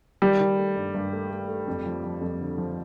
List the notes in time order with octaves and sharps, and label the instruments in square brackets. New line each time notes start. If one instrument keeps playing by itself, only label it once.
[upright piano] D#3 [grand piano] G3
[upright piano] D#3
A3
G2
G2
A3
A3
A3
F2
F3
F3
F2
D3
F3